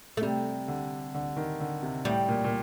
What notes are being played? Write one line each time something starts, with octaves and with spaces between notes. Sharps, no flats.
A3
C3 G3
D3
D3
D#3
D3
C3
A2 G3
A#2
A#2